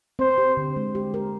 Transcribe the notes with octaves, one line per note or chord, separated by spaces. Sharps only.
C4 C5
G4
D3
G#3
G4
A#4